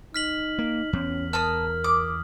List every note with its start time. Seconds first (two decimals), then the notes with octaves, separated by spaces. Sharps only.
0.14 D#4 F6 B6 F#7
0.59 A#3
0.93 E2 C#4
1.33 A#4 A5 A#5 D#6 F6
1.84 D6 D#6